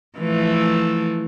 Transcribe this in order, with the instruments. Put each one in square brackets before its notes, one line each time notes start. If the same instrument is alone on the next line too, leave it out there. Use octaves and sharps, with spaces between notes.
[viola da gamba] E3 F3 A3